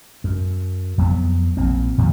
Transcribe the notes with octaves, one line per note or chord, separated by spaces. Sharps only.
F#2
F2 F#3 B3
A#1 A#2 C4
F2 A#2 D#3 F#3